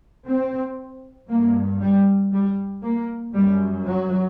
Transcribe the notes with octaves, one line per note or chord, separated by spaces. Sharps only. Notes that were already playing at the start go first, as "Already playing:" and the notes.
C4
G2 A#3
G3
G3
A#3
F#2 G3
F#3